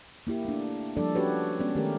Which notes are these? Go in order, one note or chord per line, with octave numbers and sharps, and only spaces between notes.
A#3 E4 G4
A3 D4
F3 G3 A#3 D4 A4 D5
C#4 D4 F#4 G4 B4 C#5
G#3 B3 C#4 D5
D#3 A3 G4 G#4 A#4